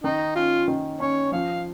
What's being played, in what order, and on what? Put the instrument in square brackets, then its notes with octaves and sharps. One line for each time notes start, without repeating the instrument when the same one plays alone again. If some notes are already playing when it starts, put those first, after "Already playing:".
[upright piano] D#3 [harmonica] D#4
[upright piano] C#4 [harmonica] F4
[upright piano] D#3
[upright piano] C#4 [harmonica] C#5
[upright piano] F3 [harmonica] F5